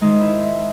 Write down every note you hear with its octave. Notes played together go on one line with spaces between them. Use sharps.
G#2 D#3 G#3 D#4
E4